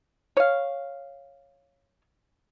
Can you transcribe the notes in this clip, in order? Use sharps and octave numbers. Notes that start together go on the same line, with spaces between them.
C#5 F5